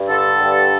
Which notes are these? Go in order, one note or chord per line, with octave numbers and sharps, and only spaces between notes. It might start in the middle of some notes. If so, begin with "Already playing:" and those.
Already playing: G2
D3 A4
G2